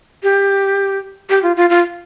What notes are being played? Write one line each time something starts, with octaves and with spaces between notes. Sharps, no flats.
G4
G4
F4
F4
F4